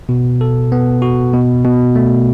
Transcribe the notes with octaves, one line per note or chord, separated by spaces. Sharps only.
B2
A4
B3
F#4
B2
B2
A3